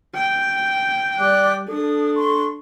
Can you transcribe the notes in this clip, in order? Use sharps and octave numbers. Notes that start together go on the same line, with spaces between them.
G5
G3 D5 D6 F#6
D4 A4 D#6
C6 C#6